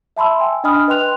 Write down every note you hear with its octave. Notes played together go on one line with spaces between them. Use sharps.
E5 A5 B5 C6 E6
G5 G#5
D4 D#5 G#5 B5 D#6 F6
B4 D#5 G5 C6 F#6 F7